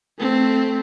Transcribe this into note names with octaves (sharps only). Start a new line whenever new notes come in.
A3 C4